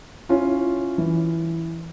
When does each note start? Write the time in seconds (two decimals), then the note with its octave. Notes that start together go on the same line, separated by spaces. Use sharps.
0.29 C#4 E4 F4
0.98 E3